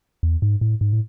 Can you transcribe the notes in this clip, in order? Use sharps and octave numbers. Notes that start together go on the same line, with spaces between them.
E2
G#2
A2
G#2
A2